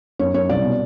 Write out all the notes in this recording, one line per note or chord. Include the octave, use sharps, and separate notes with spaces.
F#2 C#5
F#2 C#5
C2 D5
B2